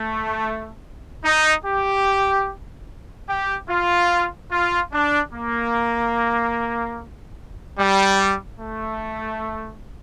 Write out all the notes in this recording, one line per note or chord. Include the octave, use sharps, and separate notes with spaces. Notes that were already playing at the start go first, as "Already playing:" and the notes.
Already playing: A3
D#4
G4
G4
F4
F4
D4
A#3
G3
A3